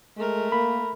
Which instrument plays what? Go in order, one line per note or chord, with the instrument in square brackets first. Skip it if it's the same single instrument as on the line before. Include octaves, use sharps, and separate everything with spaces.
[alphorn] G#3 [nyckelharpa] A3 A#4
[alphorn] A#3 [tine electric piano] B5